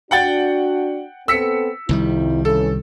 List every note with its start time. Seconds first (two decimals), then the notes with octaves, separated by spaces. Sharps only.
0.11 D4 F#4 F#5 G5 A6
1.28 B3 C4 A4 E6 B6 C#7
1.89 C2 F2 D#3 G3 E4
2.45 C#3 E3 A4